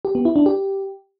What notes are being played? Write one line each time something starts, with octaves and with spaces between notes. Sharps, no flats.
G4
B3
E4
D4
G4